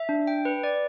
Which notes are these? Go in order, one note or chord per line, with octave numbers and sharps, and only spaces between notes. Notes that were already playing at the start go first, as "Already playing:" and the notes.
Already playing: E5
D4
G5
B4
D5